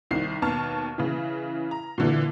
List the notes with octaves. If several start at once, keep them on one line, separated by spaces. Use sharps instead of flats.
C2 D#3 C7
D#2 B2 A5 F6
C#3 E3
A#5
A#2 D3 E3